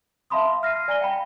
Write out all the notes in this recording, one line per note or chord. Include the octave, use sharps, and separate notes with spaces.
E5 F5 A5 B5 C6 D#6
F6 A#6 C7 D#7
D5 G#5 A#5 A#6 D#7 G7
F5 G5 B5